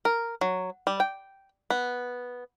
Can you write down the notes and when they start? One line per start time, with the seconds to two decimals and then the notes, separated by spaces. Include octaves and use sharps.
0.05 A#4
0.41 F#3
0.87 G3
1.00 G5
1.70 B3